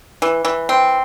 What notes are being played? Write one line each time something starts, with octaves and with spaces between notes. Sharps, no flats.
E3
E3
C4